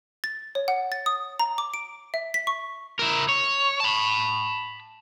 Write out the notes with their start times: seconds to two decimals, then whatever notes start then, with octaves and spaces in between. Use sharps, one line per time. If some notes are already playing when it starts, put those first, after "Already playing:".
0.24 A6
0.55 C#5
0.68 F#5
0.92 A6
1.06 D#6
1.39 A#5
1.58 D6
1.74 D7
2.14 E5
2.34 B6
2.47 C#6
2.99 E4 A#4
3.29 C#5
3.80 A5 B5